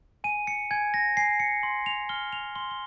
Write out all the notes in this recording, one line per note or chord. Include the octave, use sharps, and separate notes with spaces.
G#5 D#7
C#7
G#5 G#6
A#6
G#5 C7
C#7
C6
F7
F6 G7
F7
C6 G7
G7